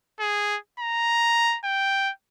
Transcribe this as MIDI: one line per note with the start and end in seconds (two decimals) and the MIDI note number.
0.20 0.57 68
0.80 1.58 82
1.64 2.11 79